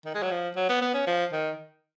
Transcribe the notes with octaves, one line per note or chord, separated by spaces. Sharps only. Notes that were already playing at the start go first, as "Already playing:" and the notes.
D#3
G#3
F#3
F3
F#3
B3
B3
C#4
F3
D#3